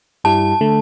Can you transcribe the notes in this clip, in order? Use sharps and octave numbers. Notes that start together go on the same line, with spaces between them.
G2 G3 E4 G4 A5
D3 A3